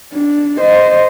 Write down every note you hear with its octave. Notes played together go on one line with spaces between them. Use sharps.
D4
C5 D#5